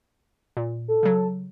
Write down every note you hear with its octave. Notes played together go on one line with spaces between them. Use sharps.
A#2
A4
C#3 F#3